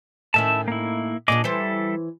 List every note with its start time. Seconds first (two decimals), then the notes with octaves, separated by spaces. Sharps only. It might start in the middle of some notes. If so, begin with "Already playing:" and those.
0.34 A2 D#3 C#4 E4 E5 A5
0.68 A#3 E4
1.28 A#2 C#4 D4 G#4 D#5 D6
1.44 E3 G3 A4 C5 E5